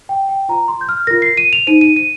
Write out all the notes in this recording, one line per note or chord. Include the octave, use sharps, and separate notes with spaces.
G5
G5
F4 C5 A#5
C6
G6
F6
F4 A#4 A#6
C7
D#7
F7
D#4 C5 D#7
D#7
D#7